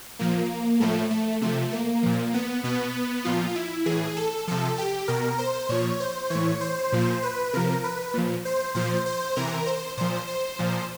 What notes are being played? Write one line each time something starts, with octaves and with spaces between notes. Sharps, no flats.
A#2 F3 A#3
A2 F3 A3
A3
C3 F3 A3
A#3
A#2 F3
B3
B2 B3
A#2 F3 F4
E4
A2 E3 G#4
A4
C3 F3 A4
G4
B2 A#4
C5
A#2 F3 C#5
C5
A2 E3 C#5
C5
A#2 F3
B4
C3 F3 A#4
B4
A#2 F3
C5
A#2 F3 C5
C5
C3 E3 A#4
C5
A#2 F3 C5
C5
A#2 F3